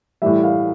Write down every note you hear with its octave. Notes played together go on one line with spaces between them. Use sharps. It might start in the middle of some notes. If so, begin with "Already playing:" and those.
A2 E3 G3 E5
F5